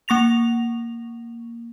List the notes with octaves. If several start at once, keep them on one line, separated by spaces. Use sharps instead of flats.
A#3 C#6 A#6 F7